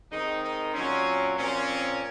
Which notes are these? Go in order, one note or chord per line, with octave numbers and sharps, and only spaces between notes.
D#3 G#3 C4 D#4
D#4
A#2 F#3 C4 C#4
A#2 F3 C4 C#4